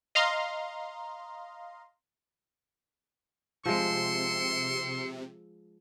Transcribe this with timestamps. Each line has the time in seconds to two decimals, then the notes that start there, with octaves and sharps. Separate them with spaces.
0.15 D#5 F5 A#5 C6
3.66 C3 F3 G#3 C6 E6 C#7